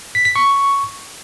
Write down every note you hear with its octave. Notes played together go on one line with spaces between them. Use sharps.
B6
B6
C#6